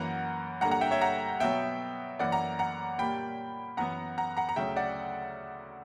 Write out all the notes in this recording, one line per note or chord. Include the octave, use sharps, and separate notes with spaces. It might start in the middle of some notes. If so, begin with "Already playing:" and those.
Already playing: F#2 E3 A#3 F#5 A#5
G2 D3 A#3 F#5 A#5
F#5 A#5
E5 G5
C#5 E5
F#5 A#5
B2 F#3 B3 E5 G5
F#2 E3 A#3 D5 F#5
F#5 A#5
F#5 A#5
A#2 G3 A#3 G5 B5
F#2 E3 B3 F#5 A#5
F#5 A#5
F#5 A#5
A#5
D2 C#3 F#3 E5 G5
D5 F#5